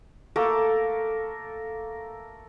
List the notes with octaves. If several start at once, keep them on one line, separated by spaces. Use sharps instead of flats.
A3 A#3 A4 A#4